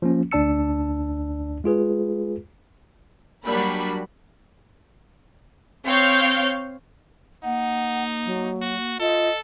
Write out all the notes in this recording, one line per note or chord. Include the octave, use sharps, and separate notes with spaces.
F3 A#3 C#4
D2 D4 D5 A5 E6 C#7
G#3 F4 G#4 B4
F#3 G3 A#3 D4 B5
C4 C#5 F5 G6
A#3 D#4 F#5
F#3
F#4
F4 A4 D#5